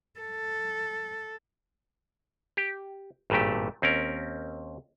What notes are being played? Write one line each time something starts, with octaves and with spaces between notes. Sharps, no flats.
A4
G4
G#1 G2 A#2 A3 G4
D#2 C4 C#4 A#4